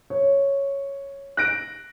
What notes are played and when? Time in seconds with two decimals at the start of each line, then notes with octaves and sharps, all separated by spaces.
0.10 C#5
1.37 F#6 A#6 D7